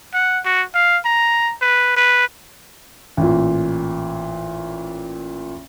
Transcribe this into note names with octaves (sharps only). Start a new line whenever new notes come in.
F#5
F#4
F5
A#5
B4
B4
A1 A#2